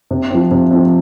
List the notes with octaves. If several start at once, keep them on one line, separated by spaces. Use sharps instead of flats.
C3
F3 C4
C3
F3 C4